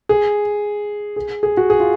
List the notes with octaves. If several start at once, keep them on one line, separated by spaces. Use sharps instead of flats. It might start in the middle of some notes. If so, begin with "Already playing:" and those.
G#4
G#4
G#4
F#4
G#4
F4